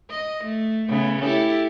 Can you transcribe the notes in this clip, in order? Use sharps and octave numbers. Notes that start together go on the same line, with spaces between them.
D#5
A3
C#3 A3 B3
E4 G4 A4